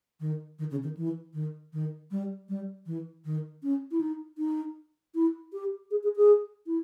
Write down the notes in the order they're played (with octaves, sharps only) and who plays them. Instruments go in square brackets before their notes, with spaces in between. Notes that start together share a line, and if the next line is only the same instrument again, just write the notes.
[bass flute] D#3
D#3
C#3
D#3
E3
D#3
D#3
G3
G3
E3
D#3
C#4
E4
D#4
D#4
E4
G4
G#4
G#4
G#4
E4